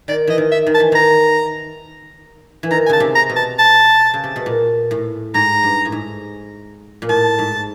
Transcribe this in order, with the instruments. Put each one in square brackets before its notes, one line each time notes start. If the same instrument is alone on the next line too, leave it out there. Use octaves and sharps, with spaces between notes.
[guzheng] D#3 [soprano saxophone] D5
[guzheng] E3 [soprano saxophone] D#5
[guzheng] D#3
[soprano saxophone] E5
[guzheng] D#3
[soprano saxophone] A5
[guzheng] E3
[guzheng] D#3 [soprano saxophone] A#5
[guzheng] E3
[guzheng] D#3 [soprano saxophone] A#5
[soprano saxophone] G#5
[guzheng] C#3 [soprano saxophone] A5
[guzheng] C3
[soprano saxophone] A#5
[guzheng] B2
[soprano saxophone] A5
A5
[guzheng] C#3
C3
B2
A#2
A2
[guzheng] G#2 [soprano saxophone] A#5
[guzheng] G2
A2
G#2
A#2
[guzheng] A2 [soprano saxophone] A5
[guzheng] G#2